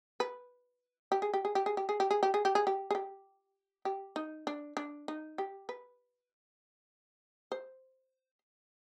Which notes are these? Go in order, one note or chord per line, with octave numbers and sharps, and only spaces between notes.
B4
G4
G#4
G4
G#4
G4
G#4
G4
G#4
G4
G#4
G4
G#4
G4
G#4
G4
G#4
G4
G4
D#4
D4
D4
D#4
G4
B4
C5